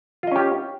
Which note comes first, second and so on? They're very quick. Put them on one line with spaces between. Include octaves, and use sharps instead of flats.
F4 D#5 C#4 G4